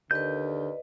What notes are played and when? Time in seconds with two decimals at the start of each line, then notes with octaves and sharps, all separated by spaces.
0.11 D#2 D3 B4 D5 D#5 G6